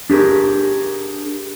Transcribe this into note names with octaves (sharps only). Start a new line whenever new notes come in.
D4 G4 G#4 A#4